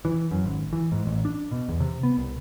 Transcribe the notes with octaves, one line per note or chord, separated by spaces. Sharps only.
E3
F#2
G#1
E3
G#2
A1
D4
B2
E2
C3
B3
C2